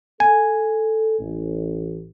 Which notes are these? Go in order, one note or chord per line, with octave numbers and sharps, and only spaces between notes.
A4 G#5
A1